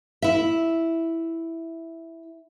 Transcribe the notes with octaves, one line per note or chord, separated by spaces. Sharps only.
E4 E5